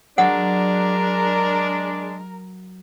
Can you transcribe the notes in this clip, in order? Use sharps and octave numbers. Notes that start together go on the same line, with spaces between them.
F#3 G#3 D4 A#4 F#5